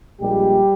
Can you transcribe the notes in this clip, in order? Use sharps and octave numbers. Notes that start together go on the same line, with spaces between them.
A#1 A#2 G3 G#3 G4